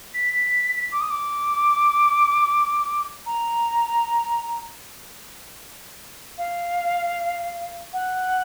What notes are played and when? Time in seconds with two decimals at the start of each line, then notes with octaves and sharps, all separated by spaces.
0.13 B6
0.91 D6
1.00 D#6
1.10 D6
3.25 A#5
6.37 F5
7.93 F#5